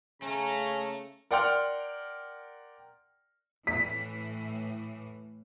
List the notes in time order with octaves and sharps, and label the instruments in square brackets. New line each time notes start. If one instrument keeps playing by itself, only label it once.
[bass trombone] C#3 [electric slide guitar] A3 [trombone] C#4 [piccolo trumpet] A#5
[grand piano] A#4 D5 F#5 G5 C6 F6
[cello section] A2 E3 [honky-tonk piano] B6